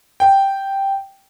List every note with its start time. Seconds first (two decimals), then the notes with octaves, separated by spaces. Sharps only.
0.20 G5